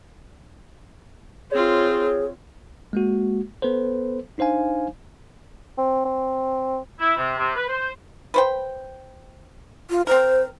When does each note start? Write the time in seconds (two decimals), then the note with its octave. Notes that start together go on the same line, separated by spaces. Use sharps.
1.51 C4 F4 G#4 C#5
2.93 G#3 A#3 F#4
3.62 B3 A4 B4 C5
4.38 D4 D#4 C5 F5 G#5
5.78 C4
6.05 C4
7.00 E4
7.17 C3
7.38 C3
7.56 B4
7.69 C5
8.34 B4 C5 G5
9.90 F4
10.07 C4 A#4 C5